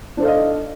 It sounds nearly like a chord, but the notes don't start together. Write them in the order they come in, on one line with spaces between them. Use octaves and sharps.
D4 C5 A4 F5 D#5